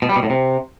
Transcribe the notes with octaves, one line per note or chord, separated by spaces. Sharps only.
B2
G3
B2
A2
C3